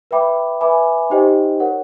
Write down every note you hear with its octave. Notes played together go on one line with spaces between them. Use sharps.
B4 E5 G5 B5 D6
B4 E5 G#5 B5 D6
D#4 G4 C5 D#5 G5
A#4 C#5 F#5